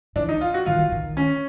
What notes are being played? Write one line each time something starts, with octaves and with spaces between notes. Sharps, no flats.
E3 D4
D#4
F4
F#4
D#3 F4
E3
D#3
C#4